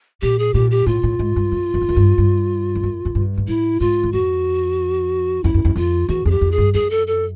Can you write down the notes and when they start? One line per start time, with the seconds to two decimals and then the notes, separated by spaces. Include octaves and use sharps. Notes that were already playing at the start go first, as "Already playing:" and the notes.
0.22 A#2 G4
0.39 G#4
0.54 A#2 G4
0.71 G4
0.86 A2 F4
1.03 A2
1.19 G#2
1.36 G2
1.52 F#2
1.74 F#2
1.82 F2
1.89 F#2
1.96 G2
2.18 G2
2.75 F2
2.83 F#2
3.05 F#2
3.15 G2
3.38 G#2
3.48 A2 E4
3.80 G#2 F4
4.03 E2
4.13 F2 F#4
5.44 F2 E4
5.54 F#2
5.65 F2
5.76 F2 F4
6.09 E2 F#4
6.25 F2 G#4
6.31 G4
6.41 F2
6.52 G#4
6.58 G2
6.74 F#2 G#4
6.90 A4
7.07 A4